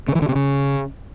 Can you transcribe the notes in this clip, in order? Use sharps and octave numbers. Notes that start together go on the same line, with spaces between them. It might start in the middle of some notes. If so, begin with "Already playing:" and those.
C#3
E3
D3
C3
C#3